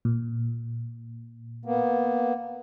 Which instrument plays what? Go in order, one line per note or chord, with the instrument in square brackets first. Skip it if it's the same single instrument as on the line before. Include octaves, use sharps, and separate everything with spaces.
[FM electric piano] A#2
[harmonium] A#3 B3